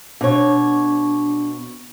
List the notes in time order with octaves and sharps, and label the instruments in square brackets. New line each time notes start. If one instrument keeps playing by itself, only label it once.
[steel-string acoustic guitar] B2 C#5 [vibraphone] D4